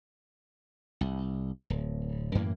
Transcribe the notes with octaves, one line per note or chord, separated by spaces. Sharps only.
C2
D1
F#2 A2 E3 A#3